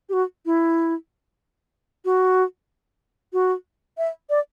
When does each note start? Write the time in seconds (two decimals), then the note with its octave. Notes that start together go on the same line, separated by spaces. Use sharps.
0.09 G4
0.13 F#4
0.46 E4
2.05 F#4
3.33 F#4
3.98 E5
4.30 D5